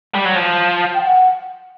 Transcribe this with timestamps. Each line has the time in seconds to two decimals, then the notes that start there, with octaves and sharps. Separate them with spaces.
0.15 G3
0.25 F#3
0.36 F3
0.94 G5
1.03 F#5